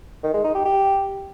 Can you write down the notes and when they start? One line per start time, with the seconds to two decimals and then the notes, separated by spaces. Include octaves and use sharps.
0.24 D#3
0.34 G#3
0.44 D#4
0.55 G4
0.65 G4